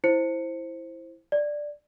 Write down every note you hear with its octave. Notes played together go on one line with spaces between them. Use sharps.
E4 C5 C#7
D5